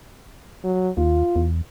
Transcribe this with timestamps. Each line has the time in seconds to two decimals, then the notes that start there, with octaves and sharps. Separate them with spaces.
0.64 F#3
0.97 D#2 F4
1.36 E2